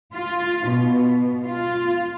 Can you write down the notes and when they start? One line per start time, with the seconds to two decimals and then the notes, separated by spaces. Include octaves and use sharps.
0.15 F4
0.68 B2
1.45 F4